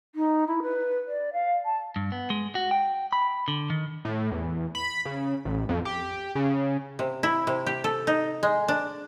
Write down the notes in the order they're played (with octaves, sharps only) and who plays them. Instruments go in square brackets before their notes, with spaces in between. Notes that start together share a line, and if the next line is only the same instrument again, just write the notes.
[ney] D#4
E4
B4
D5
F5
A5
[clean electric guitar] G2
B3
G#3
F#4
G5
B5
D3
D#3
[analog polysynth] A2
E2
B5
C#3
A1
F2
G4
C#3
[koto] C3
E4
C3
G4
A4
D#4
G#3
D4